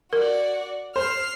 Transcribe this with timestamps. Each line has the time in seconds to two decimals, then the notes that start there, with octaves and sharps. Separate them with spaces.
0.13 F#4 A#4 D5
0.96 C5 F6 C7